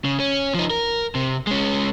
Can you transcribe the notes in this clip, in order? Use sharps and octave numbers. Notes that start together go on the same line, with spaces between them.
C#3
C#4
F3 D#4
A#4
C3
G#3 C#4